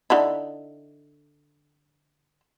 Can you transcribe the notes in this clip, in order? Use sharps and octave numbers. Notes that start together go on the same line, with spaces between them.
D3 D#4 E4